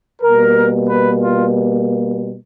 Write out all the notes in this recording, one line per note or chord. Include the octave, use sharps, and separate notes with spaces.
B2 G3 A#3 A#4
B4
F4